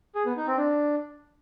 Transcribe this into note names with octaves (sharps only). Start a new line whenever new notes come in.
G#4
B3
D#4
C4
D4